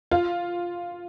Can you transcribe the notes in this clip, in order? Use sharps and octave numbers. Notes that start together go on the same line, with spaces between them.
F4